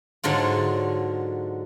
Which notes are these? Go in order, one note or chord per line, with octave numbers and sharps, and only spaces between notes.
G#2 D3 F#3 F4